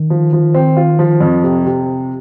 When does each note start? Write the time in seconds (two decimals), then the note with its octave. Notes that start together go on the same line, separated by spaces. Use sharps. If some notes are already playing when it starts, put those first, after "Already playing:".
Already playing: D#3
0.10 F3
0.33 F3
0.54 C4
0.77 F4
0.99 F3
1.21 F2
1.43 C3
1.66 C3